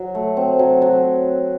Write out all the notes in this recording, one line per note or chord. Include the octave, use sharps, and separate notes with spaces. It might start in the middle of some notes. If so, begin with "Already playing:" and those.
Already playing: F#3
A3
C4
F#3
F#3